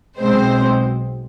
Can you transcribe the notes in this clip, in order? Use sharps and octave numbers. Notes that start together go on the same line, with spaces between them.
B1 B2 G#3 C4 C5